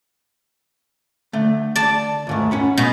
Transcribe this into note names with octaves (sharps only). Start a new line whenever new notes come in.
D3 A3
D5 A5
D#2 G#2 A3
C#4 F#5 B5
B2 G#3